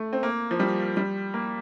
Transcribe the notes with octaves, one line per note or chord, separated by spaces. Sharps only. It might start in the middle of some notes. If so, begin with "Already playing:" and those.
Already playing: A3
C4
A#3
F3
G3
G3
A#3